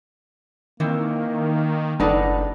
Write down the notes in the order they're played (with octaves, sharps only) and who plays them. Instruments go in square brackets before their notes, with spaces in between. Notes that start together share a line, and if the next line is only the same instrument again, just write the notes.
[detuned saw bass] D#3 [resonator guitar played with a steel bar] E3 C4 [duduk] A#3
[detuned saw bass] F#1 [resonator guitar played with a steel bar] A2 D#4 F#5 [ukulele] D4 A4 B4